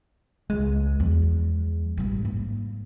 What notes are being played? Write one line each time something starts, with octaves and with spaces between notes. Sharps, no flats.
C#2 G#3
E2 F3
A1 G2
G#2 A#3